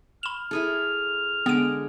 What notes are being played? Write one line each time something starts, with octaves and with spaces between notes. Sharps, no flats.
B5 F6 E7
E4 G#4 A4
D3 G#3 B3 D7